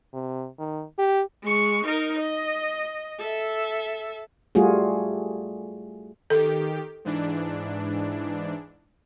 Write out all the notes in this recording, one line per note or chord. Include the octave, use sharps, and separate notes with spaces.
C3
D#3
G4
G#3 C#6
D#4 A#4
D#5
A4 E5
G3 A3 F4 F#4 G#4
D#3 G4 A4
G#2 E3 D4